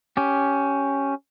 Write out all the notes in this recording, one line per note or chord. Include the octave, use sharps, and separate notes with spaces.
C#4 G4